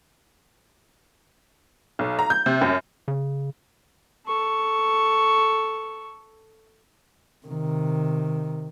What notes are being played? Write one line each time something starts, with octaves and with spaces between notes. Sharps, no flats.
B1
A#5
G6
C3
F#2
C#3
A4 C#6
C3 D#3